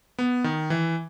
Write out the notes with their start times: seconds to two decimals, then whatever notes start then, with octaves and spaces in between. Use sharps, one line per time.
0.19 B3
0.44 D#3
0.70 E3